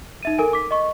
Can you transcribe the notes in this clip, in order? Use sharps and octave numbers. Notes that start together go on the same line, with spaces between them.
D#4 E5 D#7
A4 A#4 G#5
D6 B6
D#5 C#6